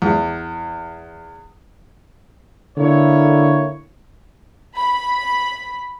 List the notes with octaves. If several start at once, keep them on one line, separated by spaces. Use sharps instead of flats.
E2
D3 A#3 E4 C#5
B5